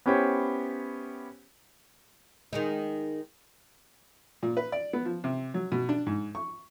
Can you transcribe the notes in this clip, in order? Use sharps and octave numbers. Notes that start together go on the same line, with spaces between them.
B3 C#4 E4 G4 C5 C#5
D#3 G#3 D#4
A#2
B4
D5
B3
F3
C3
F#3
B2
D4
G#2
C#6